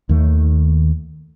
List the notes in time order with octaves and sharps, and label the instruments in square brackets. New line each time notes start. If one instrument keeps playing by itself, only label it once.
[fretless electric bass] D#2 D#3 A3